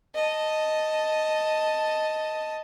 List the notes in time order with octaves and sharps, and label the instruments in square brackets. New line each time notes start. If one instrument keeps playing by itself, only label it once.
[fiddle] D#5 A5